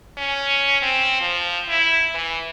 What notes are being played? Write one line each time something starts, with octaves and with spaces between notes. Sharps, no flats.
C#4
C4
F3
E4
E3